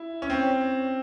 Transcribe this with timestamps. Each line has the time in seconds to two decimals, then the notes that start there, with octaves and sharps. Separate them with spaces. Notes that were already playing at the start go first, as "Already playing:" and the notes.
Already playing: E4
0.22 C#4
0.30 C4